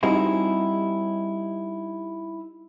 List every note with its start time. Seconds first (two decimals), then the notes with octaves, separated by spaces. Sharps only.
0.03 G3 C4 D#4 E4 F#4 G#4